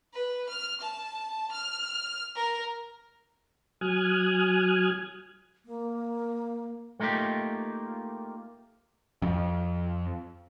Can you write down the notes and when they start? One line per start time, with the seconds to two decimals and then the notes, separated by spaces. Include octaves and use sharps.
0.14 B4
0.49 F6
0.81 A5
1.52 F6
2.35 A#4
3.81 F#3 G#5 D#6 F6 F#6 G#6
5.66 A#3
7.00 A3 A#3 D#4 F4 G4
9.22 F2